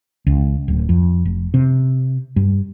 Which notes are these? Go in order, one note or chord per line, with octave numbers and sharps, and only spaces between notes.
C#2
D1
F2
F1
C3
G2